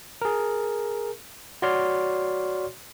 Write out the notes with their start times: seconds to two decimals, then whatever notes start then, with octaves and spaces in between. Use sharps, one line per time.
0.22 G#4 A#4
1.62 F#4 C#5 D5 C6 F6